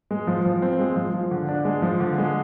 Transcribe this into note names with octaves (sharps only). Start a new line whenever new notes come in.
G#3
F3
F3
C4
G#3
F3
F3
D3
D4
G#3
F3
D3
G#3